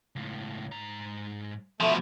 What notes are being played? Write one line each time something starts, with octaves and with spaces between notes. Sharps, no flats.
C#2 A2
G#2 A#5
B2 F3 A3